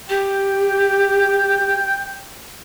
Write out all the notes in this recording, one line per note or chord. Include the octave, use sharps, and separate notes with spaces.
G4 G5